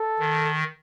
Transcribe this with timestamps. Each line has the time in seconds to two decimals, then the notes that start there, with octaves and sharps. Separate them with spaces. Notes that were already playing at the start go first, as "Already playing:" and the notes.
Already playing: A4
0.19 D#3